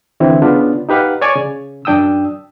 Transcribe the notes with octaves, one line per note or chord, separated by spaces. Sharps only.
D3 E3 C4 E4
C#3 B3 D4 F4
D#4 G4 B4 F5 F#5
C#5 D5 G#5 C#6
C#3
F#2 D4 G5 D#6 E6